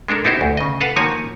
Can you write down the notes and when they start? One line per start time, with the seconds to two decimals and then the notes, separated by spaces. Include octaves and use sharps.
0.08 G#3 D4 A4 A#4
0.24 B3 D#4 E4 F#4 G4 C5
0.41 D2
0.57 C#3 D#5
0.81 A4 B4 F5 F#5
0.96 D#3 F3 A#3 F#4 C#5 G#5